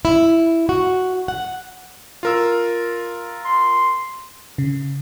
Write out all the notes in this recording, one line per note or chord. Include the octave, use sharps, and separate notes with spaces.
E4
F#4
F#5
F4 A#4 E6
C6
C#3